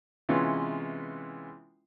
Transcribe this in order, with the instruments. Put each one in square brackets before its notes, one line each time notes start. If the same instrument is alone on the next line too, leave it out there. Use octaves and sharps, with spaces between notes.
[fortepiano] C3 E3 G#3 B3 C#4 F4